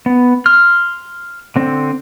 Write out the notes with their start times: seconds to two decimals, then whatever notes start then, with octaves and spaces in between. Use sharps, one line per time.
0.06 B3
0.46 C6 F6
1.56 D3 C4